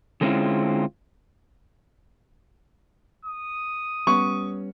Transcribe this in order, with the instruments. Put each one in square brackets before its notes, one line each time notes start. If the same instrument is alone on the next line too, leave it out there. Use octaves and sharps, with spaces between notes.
[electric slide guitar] D3 G#3 C4 C#4 E4 F4
[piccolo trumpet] D#6
[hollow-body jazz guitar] G3 B3 C#4 [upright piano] C#6